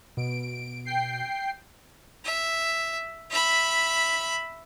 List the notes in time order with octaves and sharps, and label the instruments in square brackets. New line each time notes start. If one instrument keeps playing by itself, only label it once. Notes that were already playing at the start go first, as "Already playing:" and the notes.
[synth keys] B2 [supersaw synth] D7
[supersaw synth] G5 C7
[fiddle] E5
E5 B5